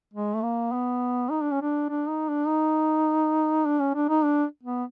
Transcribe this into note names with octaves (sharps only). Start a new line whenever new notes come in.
G#3
A3
A#3
B3
D#4
D4
C#4
D4
D4
D#4
D4
D#4
D4
C#4
D4
D#4
D4
B3